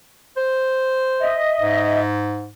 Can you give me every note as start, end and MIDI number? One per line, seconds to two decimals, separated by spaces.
0.37 1.44 72
1.20 2.01 75
1.20 2.01 76
1.60 2.50 44